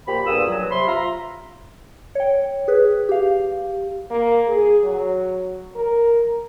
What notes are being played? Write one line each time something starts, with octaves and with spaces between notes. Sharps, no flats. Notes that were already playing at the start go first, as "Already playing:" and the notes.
A#2 F3 G4 B5
E2 G2 A#2 D#6 E6
G2 F#3
C3 B5 C6
F4 E5 A#5
C#5 G5
G#4 B4
G4 F5
A#3
G#4
F#3
A#4